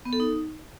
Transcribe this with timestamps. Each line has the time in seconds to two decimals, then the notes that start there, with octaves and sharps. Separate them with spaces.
0.05 B3
0.13 A4
0.20 D#4